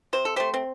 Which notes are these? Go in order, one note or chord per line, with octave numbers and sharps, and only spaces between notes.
C3 C5
A4
A3 G4 C5
C4